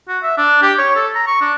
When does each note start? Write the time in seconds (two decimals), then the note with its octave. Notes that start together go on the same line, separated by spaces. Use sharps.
0.08 F#4
0.23 E5
0.38 D4
0.62 G4
0.78 C#5
0.96 A4
1.15 A#5
1.27 C#6
1.41 D4